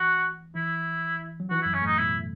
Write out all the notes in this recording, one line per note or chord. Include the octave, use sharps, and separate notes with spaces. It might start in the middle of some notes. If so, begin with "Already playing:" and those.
Already playing: E3 F#4
E3 E4
F#3
E3 F#4
E4
F#2 F#3
C#4
A2 A3
D#4
B2 B3 E4